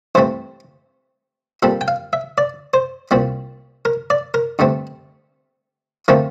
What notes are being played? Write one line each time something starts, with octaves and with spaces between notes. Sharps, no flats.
G2 E3 A3 C4 C5
A#2 G3 C4 A4
G5
F5
E5
D5
C5
C2 A#2 G3 C4
A#4
D5
A#4
G2 D3 A3 C4
D3 F3 A3 C4 A#4